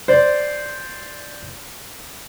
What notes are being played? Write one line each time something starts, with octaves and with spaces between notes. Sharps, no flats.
C5 D5